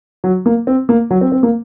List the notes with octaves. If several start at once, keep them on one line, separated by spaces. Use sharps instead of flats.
F#3
A#3
C4
A#3
F#3
C4
C4
A#3